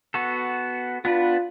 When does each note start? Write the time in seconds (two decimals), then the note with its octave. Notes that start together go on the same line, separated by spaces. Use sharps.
0.14 B3 F#4 A4
1.05 B3 D4 F4 B4